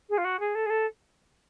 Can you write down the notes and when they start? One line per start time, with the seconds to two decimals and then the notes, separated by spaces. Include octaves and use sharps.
0.09 G#4
0.17 F4
0.24 F#4
0.39 G#4
0.55 A4
0.65 G#4
0.69 A4